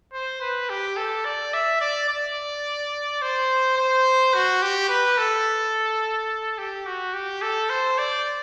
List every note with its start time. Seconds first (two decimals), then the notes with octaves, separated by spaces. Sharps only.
0.13 C5
0.41 B4
0.69 G4
0.97 A4
1.25 D5
1.53 E5
1.81 D5
2.09 D5
3.22 C5
3.78 C5
4.34 F#4
4.62 G4
4.89 B4
5.18 A4
6.58 G4
6.86 F#4
7.14 G4
7.42 A4
7.70 C5
7.98 D5